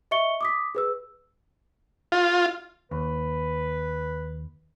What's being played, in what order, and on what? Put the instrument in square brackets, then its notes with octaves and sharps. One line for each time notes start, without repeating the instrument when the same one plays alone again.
[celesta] D#5 E5 C#6 C#7 G7
D6 D#6 B6
G#4 B4 E6
[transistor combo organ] F4
[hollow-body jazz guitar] D#2 [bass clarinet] B4